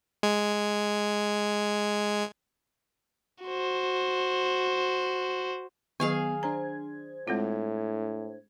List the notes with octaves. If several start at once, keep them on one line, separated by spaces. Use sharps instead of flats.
G#3 G#6
F#4 C5
D#3 F#3 B3 G#4 F5 G#5
D4 C5 A#5 G#6
A2 G#3 C4 F4